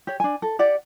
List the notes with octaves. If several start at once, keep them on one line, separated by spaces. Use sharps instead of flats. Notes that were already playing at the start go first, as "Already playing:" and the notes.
G4 C#5
D4 G#5
A4
G4 D5 F#5